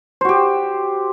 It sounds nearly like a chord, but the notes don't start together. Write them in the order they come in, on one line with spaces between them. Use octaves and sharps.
C5 F#4 G4